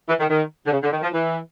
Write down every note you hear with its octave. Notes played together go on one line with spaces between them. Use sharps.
E3
D#3
D#3
D3
C#3
D3
D#3
F3
E3